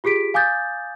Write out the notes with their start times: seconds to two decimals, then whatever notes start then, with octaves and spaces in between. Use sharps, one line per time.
0.04 F4 G4 G#4 B6 D7
0.34 F5 G#5 D6 D#6 G6 A6